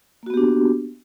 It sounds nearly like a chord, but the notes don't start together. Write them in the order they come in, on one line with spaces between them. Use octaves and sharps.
A#3 F#4 B3 G4 D4